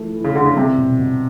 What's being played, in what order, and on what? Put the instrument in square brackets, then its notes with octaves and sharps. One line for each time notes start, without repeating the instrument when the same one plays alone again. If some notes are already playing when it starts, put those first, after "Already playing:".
Already playing: [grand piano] E3 F3 A3
E3
[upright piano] C#3
[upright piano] D3 [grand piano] E3
[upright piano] C#3
[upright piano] C3 [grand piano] G3
[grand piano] B2
B2